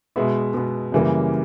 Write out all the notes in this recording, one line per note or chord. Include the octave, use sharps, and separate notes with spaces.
B2 G#3 B3 E5
B2 G#3 B3
F#2 C#3 E3 G3 A#3